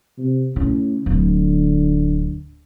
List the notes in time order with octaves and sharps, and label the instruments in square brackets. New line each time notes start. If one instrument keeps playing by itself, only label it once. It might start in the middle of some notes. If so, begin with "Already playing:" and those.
[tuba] C3
[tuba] A2 [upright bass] C#3
[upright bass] D1 [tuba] D3